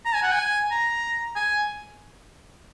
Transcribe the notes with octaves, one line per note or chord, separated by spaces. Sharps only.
A#5
G#5
F#5
G#5
A#5
G#5